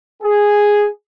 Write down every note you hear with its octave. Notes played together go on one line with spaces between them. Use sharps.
G#4